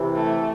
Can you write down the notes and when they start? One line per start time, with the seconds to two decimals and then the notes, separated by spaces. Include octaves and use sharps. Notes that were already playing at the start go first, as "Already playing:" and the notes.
Already playing: C3 E3
0.16 A3